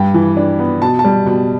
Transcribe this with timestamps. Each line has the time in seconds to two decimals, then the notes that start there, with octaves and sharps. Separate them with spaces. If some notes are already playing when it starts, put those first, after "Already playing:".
Already playing: G2 G5
0.14 E3
0.37 D4
0.59 B3
0.82 B2 A5
0.99 A5
1.05 G3
1.26 B2